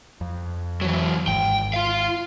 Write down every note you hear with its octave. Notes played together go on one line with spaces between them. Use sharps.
F2
E3 F#3
G#1 G#2 G5
F4 F5